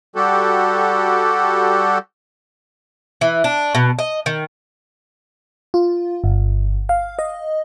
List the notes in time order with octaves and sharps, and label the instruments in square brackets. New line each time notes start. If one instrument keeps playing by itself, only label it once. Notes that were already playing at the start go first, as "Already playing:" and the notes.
[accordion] G3 F#4 G4 A4
[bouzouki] E3
D4
B2
D#5
D#3
[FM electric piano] F4
G1
F5
D#5